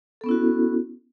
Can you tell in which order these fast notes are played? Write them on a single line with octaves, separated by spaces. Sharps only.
A4 B3 C#4 E4 F#4